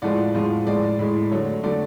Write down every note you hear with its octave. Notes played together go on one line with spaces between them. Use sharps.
A2 F3 G#3 D5 F#5
A2 F3 G#3
A2 G#3 D5
A2 G#3
D3 F#3 A3 C#5
D3 F#3 A3 D5